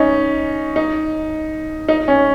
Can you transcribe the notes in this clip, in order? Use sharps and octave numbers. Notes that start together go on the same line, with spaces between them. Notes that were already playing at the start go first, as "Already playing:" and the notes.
Already playing: C#4 D#4
D#4
D#4
C#4